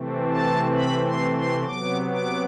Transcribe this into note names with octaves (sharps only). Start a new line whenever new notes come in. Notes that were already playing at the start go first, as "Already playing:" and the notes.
Already playing: C3 E3 A3 C4
A5
B5
C6
C6
C3 F#3 B3 D6
D6